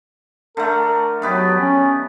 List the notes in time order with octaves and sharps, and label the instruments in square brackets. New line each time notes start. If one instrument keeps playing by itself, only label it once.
[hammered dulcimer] D3 A3 [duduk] A#4
[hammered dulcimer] D#3 B3 G4 [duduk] F#3
[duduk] C#4